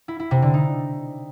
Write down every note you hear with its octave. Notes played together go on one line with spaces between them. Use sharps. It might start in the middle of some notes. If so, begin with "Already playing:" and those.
E4
E4
C3
D3
D#4